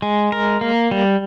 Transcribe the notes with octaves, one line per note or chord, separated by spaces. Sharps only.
G#3
A#4
A#3
G3